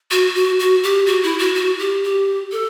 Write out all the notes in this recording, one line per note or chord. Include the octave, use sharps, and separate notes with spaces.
F#4
F#4
F#4
G4
F#4
E4
F#4
F#4
G4
G4
A4